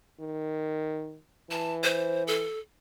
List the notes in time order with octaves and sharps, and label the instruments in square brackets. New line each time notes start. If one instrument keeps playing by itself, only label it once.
[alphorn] D#3
[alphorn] E3 [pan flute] A5
[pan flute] C5
A4